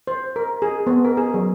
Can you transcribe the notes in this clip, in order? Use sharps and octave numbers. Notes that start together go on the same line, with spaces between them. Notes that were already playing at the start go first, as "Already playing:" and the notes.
C5
A#4
G#4
B3
A#4
G#4
F#3